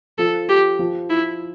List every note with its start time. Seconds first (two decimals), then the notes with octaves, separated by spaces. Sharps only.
0.18 F3 A4
0.49 G4
0.79 F3
1.09 E4